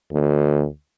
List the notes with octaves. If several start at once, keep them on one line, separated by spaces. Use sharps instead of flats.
D2